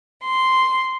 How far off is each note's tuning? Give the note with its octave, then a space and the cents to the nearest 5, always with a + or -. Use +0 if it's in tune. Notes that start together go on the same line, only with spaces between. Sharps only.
C6 -5